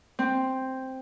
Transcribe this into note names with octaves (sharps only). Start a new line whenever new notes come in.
C4